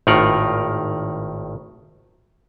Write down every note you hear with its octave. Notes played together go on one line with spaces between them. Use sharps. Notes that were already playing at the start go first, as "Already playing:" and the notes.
G#1 A2 D#3 F4 A#4 F#5